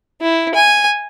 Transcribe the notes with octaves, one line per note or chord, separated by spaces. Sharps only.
E4
G#5